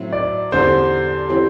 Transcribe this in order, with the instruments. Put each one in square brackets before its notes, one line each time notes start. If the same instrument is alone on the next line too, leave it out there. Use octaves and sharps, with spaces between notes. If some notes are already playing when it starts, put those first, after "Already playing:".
Already playing: [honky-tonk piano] A2 F#3 C4 E4
[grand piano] D5
[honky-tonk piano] E2 D3 G3 D4 A4 [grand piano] C5
[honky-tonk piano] E3 G3 C4